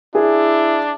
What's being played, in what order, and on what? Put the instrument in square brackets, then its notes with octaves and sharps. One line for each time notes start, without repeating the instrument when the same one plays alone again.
[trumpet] D4 [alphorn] E4 [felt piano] G#4